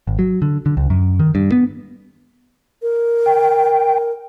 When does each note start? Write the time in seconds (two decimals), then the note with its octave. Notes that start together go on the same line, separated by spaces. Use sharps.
0.07 G#1
0.19 F#3
0.42 D3
0.66 D3
0.77 C#2
0.90 F#2
1.20 D#3
1.35 G2
1.52 B3
2.82 A#4
3.26 G5